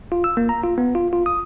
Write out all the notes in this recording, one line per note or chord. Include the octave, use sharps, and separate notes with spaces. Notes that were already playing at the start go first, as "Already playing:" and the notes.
F4
E6
A#3
A#5
F4
B3
F4
F4
D#6